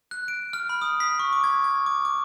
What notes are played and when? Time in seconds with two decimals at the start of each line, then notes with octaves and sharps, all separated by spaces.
0.11 F#6
0.28 D7
0.53 F6
0.69 B5
0.82 D#6
1.00 B6
1.19 C#6
1.33 D6
1.44 G#6
1.64 G#6
1.86 D6
2.05 D6